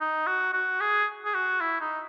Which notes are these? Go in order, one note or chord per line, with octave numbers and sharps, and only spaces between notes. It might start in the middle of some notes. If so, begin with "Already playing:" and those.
D#4
F#4
F#4
G#4
G#4
F#4
E4
D#4